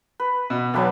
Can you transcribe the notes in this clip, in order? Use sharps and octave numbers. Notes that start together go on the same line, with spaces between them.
B4
B2
B1 F#3 D4 B4